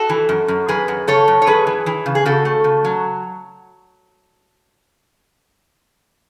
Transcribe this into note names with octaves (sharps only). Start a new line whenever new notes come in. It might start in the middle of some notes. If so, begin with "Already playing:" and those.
Already playing: F#4 A4
E3
F#2
F#2
F#2 G#4 B4
F#2
C#3 A4 C#5
F#2
C#5
F#2 G#4 B4
E3
E3
C#3
G#4
C#3 F#4 A4
A3
C#3
F#3